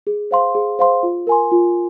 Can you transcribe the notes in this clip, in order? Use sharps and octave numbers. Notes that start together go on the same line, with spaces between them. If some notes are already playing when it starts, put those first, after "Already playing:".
G#4
C5 F5 C6
G#4
C5 F5 C6
F4
A#4 G#5 C6
F4